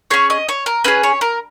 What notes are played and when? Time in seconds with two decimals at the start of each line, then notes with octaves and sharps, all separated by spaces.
0.10 C#4 G#4 C#5
0.30 D#5
0.49 C#5
0.66 A#4
0.84 C#4 G#4 B4
1.03 C#5
1.21 A#4